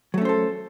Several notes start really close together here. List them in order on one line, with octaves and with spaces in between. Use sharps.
F#3 A3 C#4 C5 A4